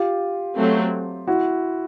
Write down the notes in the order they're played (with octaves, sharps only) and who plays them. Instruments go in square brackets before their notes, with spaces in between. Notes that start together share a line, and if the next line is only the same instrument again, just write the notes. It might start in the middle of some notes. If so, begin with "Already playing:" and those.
Already playing: [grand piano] F4 G4
[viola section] F#3 A3 C4
[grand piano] E4 F#4